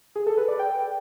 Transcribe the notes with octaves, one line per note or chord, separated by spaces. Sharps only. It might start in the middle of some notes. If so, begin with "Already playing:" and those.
G#4
A4
B4
D5
G5